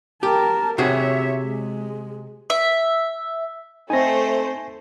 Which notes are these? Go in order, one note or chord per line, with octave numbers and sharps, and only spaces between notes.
G4 A#4 A5
C3 F#4 G#4 C#5 E5
G#3
E5
A3 C4 D#4 C5 G#5 A#6